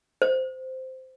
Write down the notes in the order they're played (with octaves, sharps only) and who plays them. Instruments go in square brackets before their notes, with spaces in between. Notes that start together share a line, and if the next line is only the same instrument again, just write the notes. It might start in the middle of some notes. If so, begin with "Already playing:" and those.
[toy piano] C5